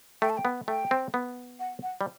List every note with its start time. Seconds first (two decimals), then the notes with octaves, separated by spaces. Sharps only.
0.22 A3 G5
0.30 A5
0.37 G5
0.45 B3
0.68 A3 G5
0.91 C4
1.14 B3
1.60 F#5
1.83 F#5
2.01 G3